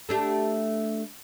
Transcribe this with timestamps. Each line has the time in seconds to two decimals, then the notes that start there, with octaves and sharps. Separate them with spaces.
0.09 A3 D4 G4